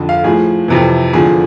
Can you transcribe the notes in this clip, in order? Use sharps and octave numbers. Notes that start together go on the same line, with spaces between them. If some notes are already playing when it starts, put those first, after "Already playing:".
Already playing: F2 D3
F5
A2 F3 G#4
F2 C3 E3
E2 D3 F3 G#4